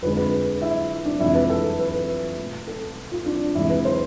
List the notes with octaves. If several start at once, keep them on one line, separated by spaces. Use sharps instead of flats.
F2 D3 G#3 B4
B4
E4
D4
F2 C3 E3 G#3 E4
B4
A4
B4
B4
B2 A3
A4
F4
D4
E2 C3 E3 G#3 E4
B4
C5